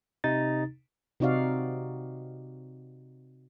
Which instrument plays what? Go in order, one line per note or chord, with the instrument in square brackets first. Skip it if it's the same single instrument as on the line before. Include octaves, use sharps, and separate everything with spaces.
[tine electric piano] C3 D#4 A6
[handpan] C3 C4 D#4 F#4 D5 F5